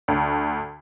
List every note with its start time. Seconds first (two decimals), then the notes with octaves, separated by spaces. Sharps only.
0.08 D2